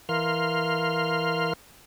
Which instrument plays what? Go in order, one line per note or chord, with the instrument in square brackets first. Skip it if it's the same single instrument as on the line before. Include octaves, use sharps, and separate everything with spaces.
[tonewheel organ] E3 A#4 F5 C6 F6